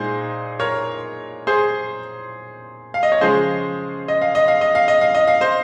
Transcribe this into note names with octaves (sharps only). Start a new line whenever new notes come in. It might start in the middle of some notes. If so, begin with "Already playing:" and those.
Already playing: A#2 G#3 D#4 G#4 C5
A#4 C#5
G#4 C5
F5
D#5
C#5
C#3 F3 G#3 C#4 G#4 C5
D#5
F5
D#5
F5
D#5
F5
D#5
F5
D#5
F5
C5 D#5